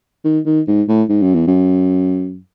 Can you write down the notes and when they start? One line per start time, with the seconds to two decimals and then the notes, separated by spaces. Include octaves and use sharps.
0.24 D#3
0.46 D#3
0.68 G#2
0.88 A2
1.09 G#2
1.22 F#2
1.35 E2
1.47 F#2